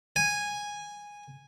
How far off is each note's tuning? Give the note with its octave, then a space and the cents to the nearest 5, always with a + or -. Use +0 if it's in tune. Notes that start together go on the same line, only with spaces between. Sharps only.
G#5 -10